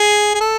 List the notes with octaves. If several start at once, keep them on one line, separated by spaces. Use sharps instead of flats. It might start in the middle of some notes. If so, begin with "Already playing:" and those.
Already playing: G#4
G#4
A4